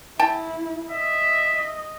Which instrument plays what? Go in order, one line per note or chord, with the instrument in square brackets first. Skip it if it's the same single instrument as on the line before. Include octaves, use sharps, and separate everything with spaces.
[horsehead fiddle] E4 [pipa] G5 A5
[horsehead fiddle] D#5 [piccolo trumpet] E5